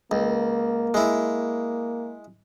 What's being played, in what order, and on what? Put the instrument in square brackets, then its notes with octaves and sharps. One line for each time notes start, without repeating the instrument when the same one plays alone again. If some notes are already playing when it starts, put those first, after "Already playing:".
[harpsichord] C#2 [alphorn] A#3
[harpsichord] G#3 E4